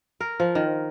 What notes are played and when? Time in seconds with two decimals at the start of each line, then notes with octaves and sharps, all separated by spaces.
0.20 A#4
0.40 F3
0.55 D#3